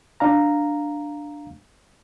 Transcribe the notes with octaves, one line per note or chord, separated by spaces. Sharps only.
D4 F5 A#5